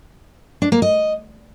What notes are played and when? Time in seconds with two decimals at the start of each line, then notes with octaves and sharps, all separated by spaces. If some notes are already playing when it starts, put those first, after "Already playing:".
0.62 D4
0.72 A#3
0.82 D#5